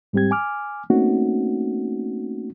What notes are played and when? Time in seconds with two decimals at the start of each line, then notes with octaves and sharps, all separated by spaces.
0.13 G#2 G3 C4 G4 G#6
0.31 G#5 D6 F6
0.90 A3 A#3 C4 C#4 D#4 F#4